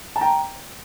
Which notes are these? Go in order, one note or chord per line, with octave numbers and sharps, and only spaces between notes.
A5
G5 A#5